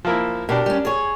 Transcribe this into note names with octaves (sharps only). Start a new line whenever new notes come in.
F3 A#3 E4
B2 D4 G4 A#4
G3 C#4
G#4 C#5